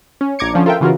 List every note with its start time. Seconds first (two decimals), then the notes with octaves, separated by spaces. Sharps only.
0.21 C#4
0.39 A#1 A#5 D6 G#6 C#7
0.54 D3 F3 C#4
0.66 F4 A4 A#4 E5 G5
0.81 C#3 E3 F4 F#4 A#4